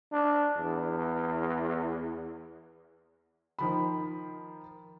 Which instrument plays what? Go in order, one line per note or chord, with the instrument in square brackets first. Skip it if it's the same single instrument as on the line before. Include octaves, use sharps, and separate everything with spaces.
[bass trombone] D4
E2
[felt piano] D#3 F3 B5